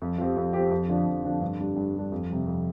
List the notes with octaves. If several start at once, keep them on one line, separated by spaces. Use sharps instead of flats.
F2
F3 C4 G4
F2
F3 C4 G4
F2
D3 F3 D4
F2
D3 F3 D4
G2
G3 D4
G2
G3 D4
F2
C3 G3
F2